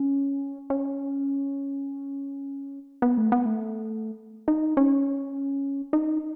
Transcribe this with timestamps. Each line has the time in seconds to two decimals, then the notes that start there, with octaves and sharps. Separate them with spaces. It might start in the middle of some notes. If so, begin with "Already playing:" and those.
Already playing: C#4
0.70 C#4
3.02 B3
3.17 A3
3.32 B3
3.46 A3
4.48 D#4
4.77 C#4
5.93 D#4